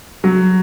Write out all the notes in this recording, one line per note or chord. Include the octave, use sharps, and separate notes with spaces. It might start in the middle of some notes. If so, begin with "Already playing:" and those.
F#3